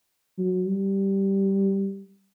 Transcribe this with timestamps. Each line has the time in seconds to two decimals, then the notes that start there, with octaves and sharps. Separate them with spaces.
0.38 F#3
0.67 G3